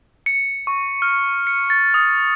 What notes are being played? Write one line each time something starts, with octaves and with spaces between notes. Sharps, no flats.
C#7
C#6
F6
C#7
A6
D#6